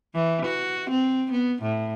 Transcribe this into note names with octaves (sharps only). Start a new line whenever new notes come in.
E3
F#4
C4
B3
A2